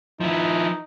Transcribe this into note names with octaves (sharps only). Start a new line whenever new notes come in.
F3 D#4 E4